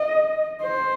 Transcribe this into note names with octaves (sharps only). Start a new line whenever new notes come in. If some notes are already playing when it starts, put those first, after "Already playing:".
Already playing: D#5
C5